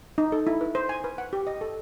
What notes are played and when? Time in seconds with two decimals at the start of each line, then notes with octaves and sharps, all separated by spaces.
0.18 D#4
0.32 A4
0.47 E4
0.61 B4
0.75 C5
0.89 G#5
1.04 B4
1.18 F#5
1.33 G4
1.47 D#5
1.61 A4